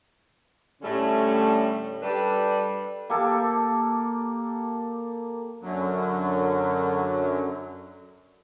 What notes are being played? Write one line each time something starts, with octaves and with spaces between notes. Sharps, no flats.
A2 D3 G3 A3 C#4
G3 D4 G4 A4 B4
A#3 G4 A4
F#2 D3 F#3